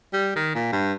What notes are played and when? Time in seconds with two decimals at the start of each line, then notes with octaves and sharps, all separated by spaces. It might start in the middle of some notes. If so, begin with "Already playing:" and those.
0.13 G3
0.36 D#3
0.55 A#2
0.72 G2